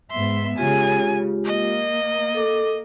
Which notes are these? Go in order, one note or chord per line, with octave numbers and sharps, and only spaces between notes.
G#2 B3 E5 C6
C#3 G#3 F4 G4 G#5
A#3 D#5
A4 D6